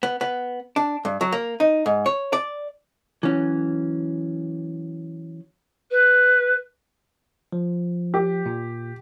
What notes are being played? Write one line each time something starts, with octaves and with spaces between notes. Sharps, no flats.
B3
B3
D4
G2
F#3
A#3
D#4
G#2
C#5
D5
E3 F#3 C#4
B4
F3
G4
A#2